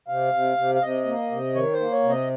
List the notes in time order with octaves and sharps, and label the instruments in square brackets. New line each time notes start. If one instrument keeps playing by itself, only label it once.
[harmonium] C3 F5
C3
C3
F5
C3 D#5
A#3
C3
D#3 C#5
C5
A#3
C#5
C3
D#5